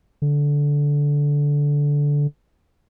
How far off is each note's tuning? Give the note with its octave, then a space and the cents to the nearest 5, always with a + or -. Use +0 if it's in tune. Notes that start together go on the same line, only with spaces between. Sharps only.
D3 -15